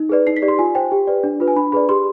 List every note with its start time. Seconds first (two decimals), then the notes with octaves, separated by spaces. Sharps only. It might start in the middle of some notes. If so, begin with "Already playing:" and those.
Already playing: D#4
0.09 G#4 B4 D5
0.27 D#4 C7
0.37 B6
0.42 G4 D5
0.48 C6
0.59 F4 G#5
0.75 C5 G5
0.92 G4
1.07 B4 D5
1.23 D4
1.40 F4 B4
1.48 G#5
1.56 D4 B5
1.72 G#4 B4 D5 B5
1.89 G4 C6